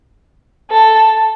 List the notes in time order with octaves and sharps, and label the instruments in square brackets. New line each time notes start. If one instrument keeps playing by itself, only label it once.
[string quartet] A4